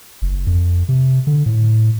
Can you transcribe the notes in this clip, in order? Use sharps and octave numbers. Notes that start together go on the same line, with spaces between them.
F#1
F2
C3
D3
A2